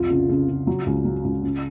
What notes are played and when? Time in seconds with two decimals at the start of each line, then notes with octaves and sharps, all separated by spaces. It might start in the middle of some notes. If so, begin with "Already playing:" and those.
Already playing: C2 F2 F4
0.10 C#3
0.29 C#3
0.48 C#3
0.67 F#3
0.86 C#2
1.05 F#3
1.24 C#2
1.43 C#3